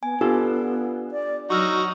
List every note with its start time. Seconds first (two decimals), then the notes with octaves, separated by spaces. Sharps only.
0.03 B3 G#5
0.21 B3 D4 F4 G4 A4
1.11 D5
1.50 F#3 D#4 F#4 C#6 E6 F6